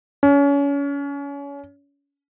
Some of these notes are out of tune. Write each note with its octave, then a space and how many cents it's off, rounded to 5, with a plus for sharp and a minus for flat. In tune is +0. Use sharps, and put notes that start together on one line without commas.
C#4 +30